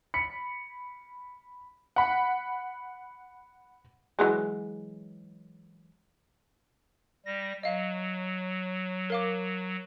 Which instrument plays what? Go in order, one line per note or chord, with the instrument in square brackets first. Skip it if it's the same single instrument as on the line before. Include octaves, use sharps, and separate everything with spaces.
[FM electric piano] B5 [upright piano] C#7
[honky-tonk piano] F#5 B5
[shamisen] E3 F#3 G#3
[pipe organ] G3 A#6
[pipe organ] F#3 [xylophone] D#5 F5
[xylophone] A#4 F5 D6